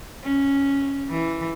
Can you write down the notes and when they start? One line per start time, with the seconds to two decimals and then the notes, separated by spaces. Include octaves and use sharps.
0.24 C#4
1.11 E3